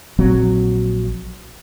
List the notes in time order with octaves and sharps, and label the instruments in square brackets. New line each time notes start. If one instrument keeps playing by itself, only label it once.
[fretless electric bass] A#1 F#3 C4